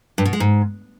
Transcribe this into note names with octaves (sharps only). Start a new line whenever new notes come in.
G2
B2
G#3
G#2